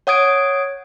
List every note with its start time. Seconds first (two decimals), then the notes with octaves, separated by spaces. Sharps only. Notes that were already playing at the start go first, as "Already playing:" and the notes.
0.07 C#5 F#5 D#6 G#6 D7